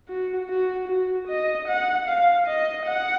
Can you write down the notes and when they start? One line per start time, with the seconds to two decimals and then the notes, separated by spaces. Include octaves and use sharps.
0.08 F#4
0.49 F#4
0.88 F#4
1.28 D#5
1.68 F#5
2.08 F5
2.47 D#5
2.87 F#5